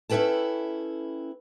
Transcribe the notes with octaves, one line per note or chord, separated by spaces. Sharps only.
C#4 E4 A4 B4 G5 A5